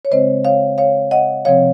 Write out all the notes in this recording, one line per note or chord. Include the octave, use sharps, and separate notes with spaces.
C#5
C#3 G#3 C4 C5 D#5
C#5 F5
C#5 F5
D#5 F#5
C3 F3 C4 C#5 F5